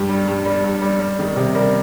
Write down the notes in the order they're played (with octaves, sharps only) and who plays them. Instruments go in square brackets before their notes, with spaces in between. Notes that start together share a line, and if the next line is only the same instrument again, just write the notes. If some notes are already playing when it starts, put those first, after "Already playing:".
Already playing: [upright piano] G2 G4
G3
G2
G3
G2
G3
G3
D#3
C3
G3 A#4